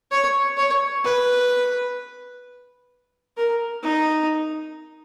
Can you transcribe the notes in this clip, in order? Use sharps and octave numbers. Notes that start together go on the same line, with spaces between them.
C#5
C#5
B4
A#4
D#4